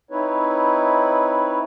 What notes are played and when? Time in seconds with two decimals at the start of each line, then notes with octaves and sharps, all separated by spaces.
0.11 C4 D#4 E4 B4 C#5